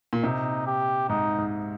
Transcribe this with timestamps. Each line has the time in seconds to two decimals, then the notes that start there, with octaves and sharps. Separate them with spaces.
0.13 A#2
0.23 C3 D#4
0.67 G4
1.09 G#2 D#4
1.38 G#2